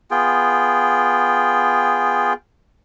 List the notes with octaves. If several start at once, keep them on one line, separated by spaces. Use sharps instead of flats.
B3 F4 G#4 G5